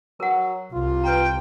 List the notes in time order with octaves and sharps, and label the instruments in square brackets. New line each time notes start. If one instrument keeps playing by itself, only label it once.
[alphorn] F#3 [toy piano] A#4 F#5
[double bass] C2 [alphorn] F4
[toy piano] B4 A#5 [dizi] G5